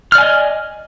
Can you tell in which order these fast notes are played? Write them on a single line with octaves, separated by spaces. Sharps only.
F6 D5 G#5 D#5